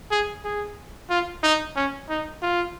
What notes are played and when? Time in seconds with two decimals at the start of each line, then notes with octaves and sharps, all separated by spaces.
0.11 G#4
0.45 G#4
1.10 F4
1.43 D#4
1.76 C#4
2.09 D#4
2.42 F4